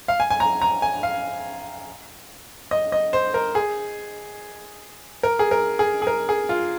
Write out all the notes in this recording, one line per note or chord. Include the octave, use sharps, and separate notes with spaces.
F5
G#5
G#5
A#5
A#5
G#5
F5
D#5
D#5
C5
A#4
G#4
A#4
G#4
A#4
G#4
G#4
A#4
G#4
F4